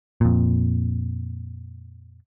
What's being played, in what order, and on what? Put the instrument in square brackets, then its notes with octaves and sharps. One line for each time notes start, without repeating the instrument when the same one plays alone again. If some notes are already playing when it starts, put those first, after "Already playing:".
[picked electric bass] F2 A#2